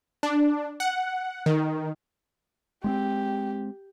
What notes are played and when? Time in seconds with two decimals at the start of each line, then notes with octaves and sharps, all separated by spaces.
0.23 D4
0.80 F#5
1.46 D#3
2.84 G#3 B3 C4 G4